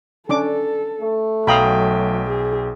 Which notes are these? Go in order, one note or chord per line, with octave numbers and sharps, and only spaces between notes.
C#4 D4 A4 D6
A3
B1 F#3 F5 G5 A#5 B5 D#6
G#4